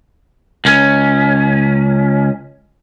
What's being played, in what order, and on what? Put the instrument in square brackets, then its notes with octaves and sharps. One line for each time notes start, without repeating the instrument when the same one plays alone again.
[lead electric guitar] C#2 C#4